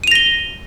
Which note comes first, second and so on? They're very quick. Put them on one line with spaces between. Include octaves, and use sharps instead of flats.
D#7 F7 A#6 G7